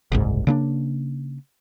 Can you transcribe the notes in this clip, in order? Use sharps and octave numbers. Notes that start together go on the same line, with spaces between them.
F#1 C2 G#2
C#3 A#3 D4